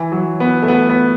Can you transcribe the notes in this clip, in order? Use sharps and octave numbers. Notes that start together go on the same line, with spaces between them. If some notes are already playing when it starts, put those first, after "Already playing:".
Already playing: E3
F#3
B3
A3
B3
B3